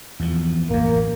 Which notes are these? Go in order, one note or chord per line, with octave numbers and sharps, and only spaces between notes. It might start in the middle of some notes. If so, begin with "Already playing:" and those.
E2 F3
A1 F#2 A#3